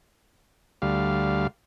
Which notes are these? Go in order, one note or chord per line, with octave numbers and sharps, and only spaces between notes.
D2 G3 F5